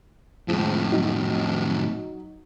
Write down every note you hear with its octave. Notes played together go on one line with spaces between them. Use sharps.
F2 A2 F3 G#3
F#3 D#4